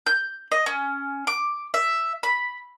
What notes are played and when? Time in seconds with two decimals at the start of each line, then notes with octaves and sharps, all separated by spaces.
0.06 G6
0.52 D#5
0.66 C#4
1.27 D6
1.74 E5
2.23 B5